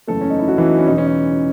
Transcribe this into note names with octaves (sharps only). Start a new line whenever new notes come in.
F#1 E2 C#3 A3 A4
C#4
D#4
E4
F#3 F#4
E3 E4
D#4
C#4
E1 E2 C#3 E3 D#4
C#4
D#4